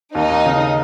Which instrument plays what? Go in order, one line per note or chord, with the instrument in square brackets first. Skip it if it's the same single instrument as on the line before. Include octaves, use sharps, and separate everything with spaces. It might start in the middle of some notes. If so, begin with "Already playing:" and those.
[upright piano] D#2 [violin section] D#4
[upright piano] D#2
C#3